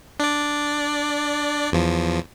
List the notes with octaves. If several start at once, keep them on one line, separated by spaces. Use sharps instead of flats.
D4 D5
E2 F3